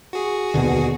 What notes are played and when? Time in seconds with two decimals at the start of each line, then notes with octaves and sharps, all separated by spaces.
0.13 F#4 G#4
0.54 D#2 B2 D3